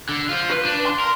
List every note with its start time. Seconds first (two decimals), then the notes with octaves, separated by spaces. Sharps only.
0.09 D3
0.29 F4 C5
0.50 B4
0.65 D4
0.86 C6
1.00 A#4